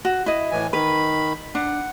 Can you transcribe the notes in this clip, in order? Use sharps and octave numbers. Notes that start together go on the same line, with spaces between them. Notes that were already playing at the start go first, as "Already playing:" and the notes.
F#4
E4 D#5
A2 E3 G#5
D#3 B4 B5
D4 F#5